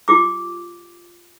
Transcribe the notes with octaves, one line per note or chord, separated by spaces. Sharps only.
F4 G4 D6